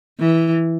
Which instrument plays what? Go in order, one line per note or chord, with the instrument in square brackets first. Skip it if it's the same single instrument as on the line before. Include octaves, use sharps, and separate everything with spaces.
[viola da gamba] E3